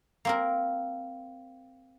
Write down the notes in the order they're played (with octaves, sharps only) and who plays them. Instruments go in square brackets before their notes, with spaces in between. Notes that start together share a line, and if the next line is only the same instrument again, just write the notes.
[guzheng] A#3 C4 A#4